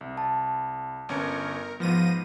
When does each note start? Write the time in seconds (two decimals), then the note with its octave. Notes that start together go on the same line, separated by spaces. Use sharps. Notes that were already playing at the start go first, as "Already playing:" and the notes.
0.01 C2
0.17 A5
1.09 G1 C#4 A#4 C#7
1.80 G#2 F3 B3 A#6 D#7